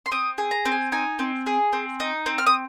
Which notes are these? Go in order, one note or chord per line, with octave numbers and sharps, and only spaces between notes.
C6
C4 D#6
G#4
A#5
C4
G#5
D#4 G#5
C4
G#4
C4
D#4
C4
F6
D#6